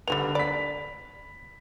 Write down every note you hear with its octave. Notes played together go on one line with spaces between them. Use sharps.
D3 G3 G#3 B3 F7
D5 B5 B6